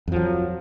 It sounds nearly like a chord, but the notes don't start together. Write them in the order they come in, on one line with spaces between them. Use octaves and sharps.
F2 F3 F#3